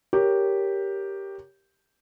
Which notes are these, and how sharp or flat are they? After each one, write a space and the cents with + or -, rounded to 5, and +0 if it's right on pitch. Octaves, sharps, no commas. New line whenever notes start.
G4 +0 A#4 +0 C#5 +0